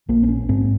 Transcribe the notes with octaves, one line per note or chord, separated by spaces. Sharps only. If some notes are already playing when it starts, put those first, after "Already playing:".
A#1 A#3
C4
C#4
G#2 C4